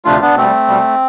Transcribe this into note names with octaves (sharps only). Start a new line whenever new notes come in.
D2 C3 F3 A3 D4 F4
B3 D4
B2 G3 A3 C4
B2 G3